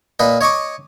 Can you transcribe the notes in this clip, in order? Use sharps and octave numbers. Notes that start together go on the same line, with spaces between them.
A#2 B4 D#5
C#5 D#5 C#6 D6